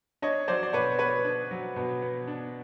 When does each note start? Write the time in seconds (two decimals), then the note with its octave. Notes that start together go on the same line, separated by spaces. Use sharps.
0.22 D4 C#5 D#5
0.48 F#3 C5 D5
0.63 D5
0.73 B2 B4 C#5
0.99 B3 B4 C#5
1.24 D4
1.51 F#3
1.76 B2
2.02 B3
2.27 D4